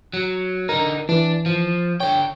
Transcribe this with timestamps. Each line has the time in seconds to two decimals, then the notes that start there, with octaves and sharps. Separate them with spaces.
0.14 F#3
0.69 D3 D#4 A#4
1.09 E3 D4
1.46 F3
2.00 D3 C#5 G5